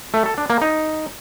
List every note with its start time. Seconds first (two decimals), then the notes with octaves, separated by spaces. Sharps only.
0.14 A3
0.26 A4
0.38 D4
0.50 A#3
0.62 D#4